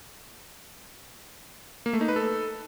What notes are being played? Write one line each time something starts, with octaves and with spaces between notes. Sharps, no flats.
A#3
A3
D#4
B4
A4